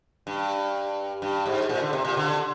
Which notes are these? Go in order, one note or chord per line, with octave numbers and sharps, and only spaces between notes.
G2
G2
G#2
A#2
D3
C3
A#2
D3